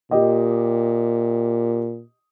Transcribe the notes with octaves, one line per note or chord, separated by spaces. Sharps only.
A#2 G4 D#5